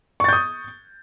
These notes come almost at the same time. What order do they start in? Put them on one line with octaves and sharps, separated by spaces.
C#6 A6 G6 D#6